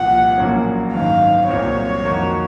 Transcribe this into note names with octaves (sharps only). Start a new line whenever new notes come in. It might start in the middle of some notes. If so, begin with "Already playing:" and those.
Already playing: C2 A#2 F3 F#5
A#1 A#2 F#3 A#3 C#4
G#1 F#2 D#3 F5
C2 A#2 F#3 C4 C#5
F2 D#3 A#3 D#4 F#4